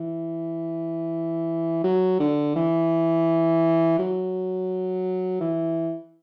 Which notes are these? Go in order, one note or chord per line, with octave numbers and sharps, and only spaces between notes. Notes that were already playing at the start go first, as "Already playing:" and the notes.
Already playing: E3
F#3
D3
E3
F#3
E3